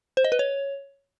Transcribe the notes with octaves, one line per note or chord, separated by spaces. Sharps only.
C5
D#5
B4
C#5